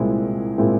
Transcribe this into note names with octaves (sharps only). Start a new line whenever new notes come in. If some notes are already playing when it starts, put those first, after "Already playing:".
Already playing: C2 A#2 G#3 C4 E4
A#2 G#3 C4 E4